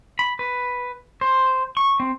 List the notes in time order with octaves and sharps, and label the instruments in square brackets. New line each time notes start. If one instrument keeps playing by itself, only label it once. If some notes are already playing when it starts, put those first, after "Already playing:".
[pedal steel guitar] B5
B4
C5
C#6
C4